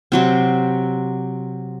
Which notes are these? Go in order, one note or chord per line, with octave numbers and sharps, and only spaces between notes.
C3 F#3 C4